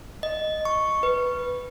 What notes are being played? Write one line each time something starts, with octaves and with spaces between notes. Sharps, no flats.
D#5
C#6
B4